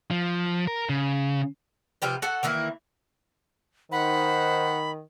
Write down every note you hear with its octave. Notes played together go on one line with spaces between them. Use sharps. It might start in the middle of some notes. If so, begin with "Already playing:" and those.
F3
A#4
C#3
C3 F3 G4 B4
F#4 A4 F#5
D#3 E3 A#3 E4
D#3 D#4 C5 F#5 B5